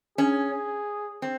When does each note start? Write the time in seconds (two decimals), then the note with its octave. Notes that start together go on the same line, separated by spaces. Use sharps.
0.18 C#4 G#4
1.22 C4